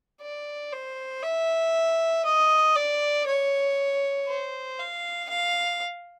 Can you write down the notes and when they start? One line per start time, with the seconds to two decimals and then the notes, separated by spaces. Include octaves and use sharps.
0.21 D5
0.72 C5
1.23 E5
2.25 D#5
2.75 D5
3.26 C#5
4.28 C5
4.79 F5
5.29 F5